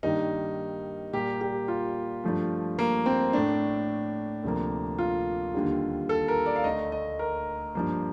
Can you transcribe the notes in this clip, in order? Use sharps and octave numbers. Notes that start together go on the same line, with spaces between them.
G2 D#3 G3 A#3 D#4
A#2 G3 A#3 G4
G4
F4
G2 F3 A3
A#3
C4
A2 A3 D4
D2 C3 F3 A#3
F4
D#2 D3 G3
A4
A#4
D5
F5
D2 D3 A3 D#5
D#5
A#4
G2 F3 A#3